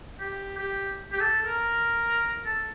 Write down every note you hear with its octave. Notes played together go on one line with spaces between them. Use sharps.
G4
G4
G4
A4
A4
A#4
A4